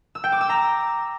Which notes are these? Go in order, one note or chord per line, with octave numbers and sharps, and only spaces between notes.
E6
G5
D6
E6
A#5